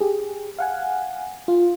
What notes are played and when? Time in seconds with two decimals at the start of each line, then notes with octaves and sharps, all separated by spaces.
0.01 G4 G#4
0.59 F5 F#5 G#5
1.48 F4